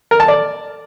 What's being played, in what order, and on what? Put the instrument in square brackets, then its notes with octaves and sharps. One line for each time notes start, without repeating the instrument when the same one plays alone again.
[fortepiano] A#4
A5
D5